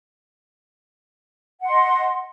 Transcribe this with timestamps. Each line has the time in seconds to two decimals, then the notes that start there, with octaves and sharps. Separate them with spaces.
1.61 F#5
1.65 C6
1.69 D#5